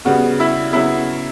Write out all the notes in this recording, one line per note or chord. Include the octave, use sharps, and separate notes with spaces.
C#3 G3 B3 F#4
E4
C#3 F#3 B3 E4